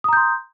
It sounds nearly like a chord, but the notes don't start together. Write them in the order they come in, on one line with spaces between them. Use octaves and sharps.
D#6 A#5 G6 C6